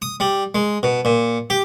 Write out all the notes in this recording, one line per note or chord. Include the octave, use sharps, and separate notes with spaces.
D#6
G3
G#3
B2
A#2
G4